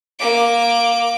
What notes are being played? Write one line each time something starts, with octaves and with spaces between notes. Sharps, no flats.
A#3 D6